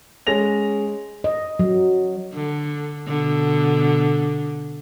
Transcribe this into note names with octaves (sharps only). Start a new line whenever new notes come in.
G#3 C#4 A#6 F7
D#5
F#3
D3
B2 D3